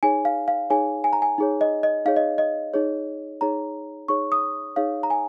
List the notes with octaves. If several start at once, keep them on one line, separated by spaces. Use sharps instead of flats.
D#4 G#4 C#5 G#5
F5
F5
D#4 G#4 C#5 G#5
G#5
A#5
G#5
D#4 G#4 C#5
D#5
D#5
D#4 G#4 C#5 F5
D#5
D#5
D#4 G#4 C#5
D#4 G#4 C#5 A#5
D#4 G#4 C#5 C#6
D#6
D#4 G#4 C#5 F5
A#5
G#5